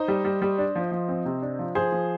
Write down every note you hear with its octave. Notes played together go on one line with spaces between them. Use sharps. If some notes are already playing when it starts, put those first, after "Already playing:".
Already playing: D#4 C5 D#5
G3
G3
G3
D4
F3
F3
C4
C3
D4
F3
F3 G#4 C5
F3